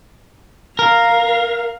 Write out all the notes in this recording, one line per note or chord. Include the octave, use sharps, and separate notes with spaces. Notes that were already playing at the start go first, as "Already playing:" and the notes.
A#4 F5